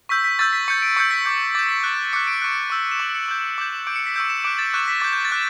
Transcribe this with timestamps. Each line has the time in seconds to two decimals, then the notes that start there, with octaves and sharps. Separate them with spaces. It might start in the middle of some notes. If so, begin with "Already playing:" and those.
0.09 C#6 E6 G6 B6
0.24 B6
0.39 C#6 E6 G6 A6
0.53 B6
0.68 C#6 G6 C#7
0.82 D7
0.96 C#6 E6 G6 C#7
1.11 B6
1.25 D6 G6
1.55 D6 G6 A6
1.69 B6
1.84 C#6 F#6
2.13 D6 F#6 C#7
2.27 D7
2.42 C#6 F#6
2.70 C#6 E6 G6
2.91 E7
2.99 C#6 G6 F#7
3.14 C#7
3.28 D6 G6
3.58 D6 G6
3.87 D6 G6 D7
3.95 C#7
4.06 B6
4.15 C#6 E6 G6 D7
4.30 E7
4.44 D6 F#6 D7
4.59 A6
4.74 C#6 F#6 G6
4.88 B6
5.00 D6 G6 A6
5.13 G6
5.25 A6
5.31 D6 F#6